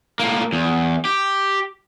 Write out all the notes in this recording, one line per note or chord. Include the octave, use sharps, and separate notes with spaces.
A2 A#3
E2
G4